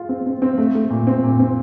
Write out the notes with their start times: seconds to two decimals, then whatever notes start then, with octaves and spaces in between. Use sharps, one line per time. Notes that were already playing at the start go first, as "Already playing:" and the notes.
Already playing: F4 G#4
0.09 C4
0.26 C4
0.42 C4
0.58 A3
0.75 A3
0.90 A#2
1.07 C4
1.23 A#2
1.39 C4